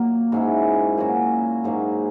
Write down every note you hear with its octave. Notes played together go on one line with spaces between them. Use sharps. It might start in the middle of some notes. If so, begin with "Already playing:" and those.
Already playing: A#2 F#3 A#3
G#2 F#3 C#4 E4
A#2 F#3 C#4 F#4
G#2 F#3 A#3